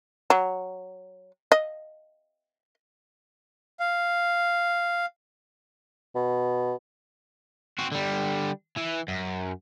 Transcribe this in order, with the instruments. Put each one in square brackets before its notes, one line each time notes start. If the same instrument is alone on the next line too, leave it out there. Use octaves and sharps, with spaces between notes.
[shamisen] F#3
D#5
[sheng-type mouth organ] F5
[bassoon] B2
[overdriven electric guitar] C4 F#4
D3 G3
E3
F#2